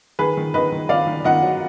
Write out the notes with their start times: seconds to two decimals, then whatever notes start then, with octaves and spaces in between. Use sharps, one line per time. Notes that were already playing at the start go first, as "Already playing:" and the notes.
0.19 D#3 G#4 B4
0.37 D#3
0.54 D#3 B4 D#5
0.72 D#3
0.89 D#3 D5 F5
1.07 D#3
1.24 D#3 D#5 F#5
1.43 F#3